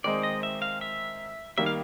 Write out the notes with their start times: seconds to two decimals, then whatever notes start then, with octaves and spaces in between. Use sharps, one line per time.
0.04 D#3 G#3 C4 D#4 D5
0.23 D#5
0.43 E5
0.62 F5
0.81 E5
1.58 D#3 G3 A#3 E5
1.66 F5